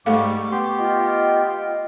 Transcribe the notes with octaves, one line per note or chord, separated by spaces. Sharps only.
G#2 G3 A3 A4 F5 C#6 D6
B3 G4 C6
F4 D#5 G5